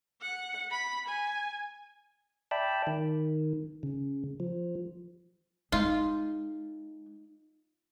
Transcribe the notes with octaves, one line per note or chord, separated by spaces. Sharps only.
F#5
B5
G#5
D5 E5 G5 A5 B5
D#3
C#3
F3
G#3 D#4 F4